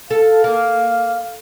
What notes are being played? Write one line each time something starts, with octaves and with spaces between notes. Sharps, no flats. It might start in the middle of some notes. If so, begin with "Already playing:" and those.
A4 F5
A#3